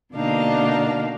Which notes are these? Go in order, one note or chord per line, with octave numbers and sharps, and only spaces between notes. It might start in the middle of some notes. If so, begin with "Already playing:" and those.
B2 D3 A#3 D4 D#4 F5